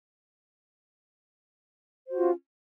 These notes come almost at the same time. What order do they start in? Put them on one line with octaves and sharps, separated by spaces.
C5 F#4 F4 C#4